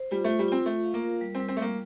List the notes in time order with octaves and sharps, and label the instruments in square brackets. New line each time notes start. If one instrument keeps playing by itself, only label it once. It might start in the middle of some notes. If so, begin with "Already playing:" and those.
Already playing: [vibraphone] C5
[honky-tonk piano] G3 [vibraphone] F4
[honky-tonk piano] A3
[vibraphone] F4
[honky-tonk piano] G3
[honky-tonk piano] C4 [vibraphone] F4
[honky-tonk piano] A3 [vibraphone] F4
[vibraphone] F5
[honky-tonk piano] A#3
[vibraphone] A#4
G3
[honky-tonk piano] C4
[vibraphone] G3
[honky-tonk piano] C4
[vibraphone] G3 [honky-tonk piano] A3 A#3